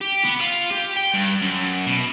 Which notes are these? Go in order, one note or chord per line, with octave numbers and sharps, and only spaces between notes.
G4
B3
F4
G4
G5
G2
F#2
B2